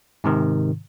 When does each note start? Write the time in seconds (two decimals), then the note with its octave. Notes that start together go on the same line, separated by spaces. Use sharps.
0.24 G#2 C3 D#3